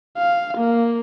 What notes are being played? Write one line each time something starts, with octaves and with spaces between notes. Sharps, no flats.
F5
A#3